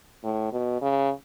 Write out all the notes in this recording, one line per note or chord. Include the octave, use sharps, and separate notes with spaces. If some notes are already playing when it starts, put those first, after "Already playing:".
A2
B2
C#3